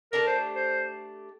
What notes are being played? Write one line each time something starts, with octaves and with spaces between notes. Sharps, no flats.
A3 D4 G4 A#4
C5
C5